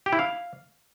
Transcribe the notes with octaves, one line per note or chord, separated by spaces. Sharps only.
G4
E4
F5